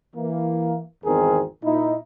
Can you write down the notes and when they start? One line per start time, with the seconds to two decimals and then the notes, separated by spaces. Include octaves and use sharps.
0.15 E3 A#3
1.05 G#1 E2 D#3 C4 G#4 A#4
1.64 A#2 D#4 E4